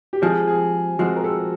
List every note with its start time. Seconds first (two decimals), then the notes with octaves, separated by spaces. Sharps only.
0.13 G4
0.22 F3 G#3 C4 G#4
0.48 G#4
0.99 F3 G#3 C4 F#4
1.16 A#4
1.24 A4